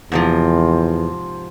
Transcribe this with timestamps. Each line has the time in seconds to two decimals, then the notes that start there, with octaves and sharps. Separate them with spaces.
0.12 E2 G#2 C3 F3